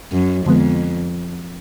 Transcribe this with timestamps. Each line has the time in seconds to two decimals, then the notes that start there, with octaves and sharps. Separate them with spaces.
0.13 F#2
0.46 F2 D3 F3 G#3 B3